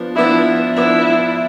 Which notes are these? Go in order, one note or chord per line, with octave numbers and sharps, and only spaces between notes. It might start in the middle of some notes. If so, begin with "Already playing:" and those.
Already playing: F3 B3 D4
F3 B3 D4 E4
F3 B3 D4 E4